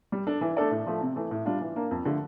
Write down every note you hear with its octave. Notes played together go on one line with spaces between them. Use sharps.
G3
D4 A4
E3
A3 D4 A4 D5
A2
F3 A3
C3
E3 A3
A2
G3 D4 F4
E3
A#3 D4
F2
D3 F3 A3